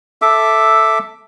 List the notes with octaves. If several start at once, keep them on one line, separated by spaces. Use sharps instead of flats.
A4 E5 D6